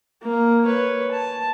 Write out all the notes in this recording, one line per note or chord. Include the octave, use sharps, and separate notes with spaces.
A#3 A#4
B4 C#5
A5